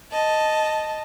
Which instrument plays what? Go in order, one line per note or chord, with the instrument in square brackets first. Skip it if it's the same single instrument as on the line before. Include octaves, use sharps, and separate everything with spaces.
[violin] D#5 A5